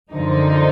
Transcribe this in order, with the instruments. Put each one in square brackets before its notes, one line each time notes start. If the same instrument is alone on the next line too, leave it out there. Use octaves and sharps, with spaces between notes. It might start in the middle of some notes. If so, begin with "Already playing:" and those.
[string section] F#2 D3 F3 D#4